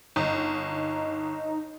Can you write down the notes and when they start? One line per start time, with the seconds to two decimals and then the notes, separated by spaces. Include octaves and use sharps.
0.16 G1 D#4